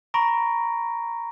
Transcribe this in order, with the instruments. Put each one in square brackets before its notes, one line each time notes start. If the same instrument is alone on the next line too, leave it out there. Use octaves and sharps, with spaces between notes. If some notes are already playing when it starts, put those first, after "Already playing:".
[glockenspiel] A#5 B5 C#6 A#6 D7